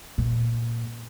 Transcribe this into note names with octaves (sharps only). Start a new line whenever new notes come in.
A#2